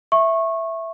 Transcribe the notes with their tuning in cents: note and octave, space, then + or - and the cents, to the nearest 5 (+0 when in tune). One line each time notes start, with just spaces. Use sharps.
E5 +0 C#6 -20